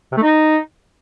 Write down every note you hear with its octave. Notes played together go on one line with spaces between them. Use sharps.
C3
A3
D#4